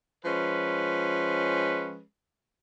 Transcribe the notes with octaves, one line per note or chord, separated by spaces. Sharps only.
F3 G#3 C#4 B4